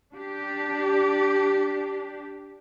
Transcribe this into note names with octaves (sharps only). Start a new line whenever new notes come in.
D4 G4